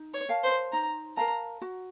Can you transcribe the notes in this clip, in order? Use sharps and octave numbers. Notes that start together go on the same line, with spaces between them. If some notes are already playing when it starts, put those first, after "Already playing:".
Already playing: D#4
C#5
A#4 F5 A5
C5
D#4 A#5
A#4 F5 A5 A#5
F#4